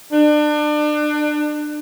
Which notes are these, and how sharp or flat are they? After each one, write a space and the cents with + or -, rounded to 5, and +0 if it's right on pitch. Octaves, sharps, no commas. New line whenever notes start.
D4 +30